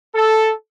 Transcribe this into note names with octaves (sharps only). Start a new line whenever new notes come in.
A4